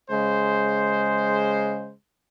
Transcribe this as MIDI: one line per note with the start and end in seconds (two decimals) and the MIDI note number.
0.10 1.92 49
0.10 1.92 56
0.10 1.92 72